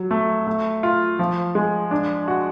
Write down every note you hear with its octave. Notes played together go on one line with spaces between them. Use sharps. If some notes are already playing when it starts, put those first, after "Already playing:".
Already playing: F#3
A3
A3
F4
F3
G#3
D4
F#4